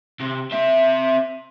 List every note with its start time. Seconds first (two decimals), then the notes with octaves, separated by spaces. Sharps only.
0.20 C3
0.52 C4 E5